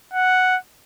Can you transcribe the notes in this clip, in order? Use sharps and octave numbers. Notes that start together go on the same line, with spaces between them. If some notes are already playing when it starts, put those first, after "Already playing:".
F#5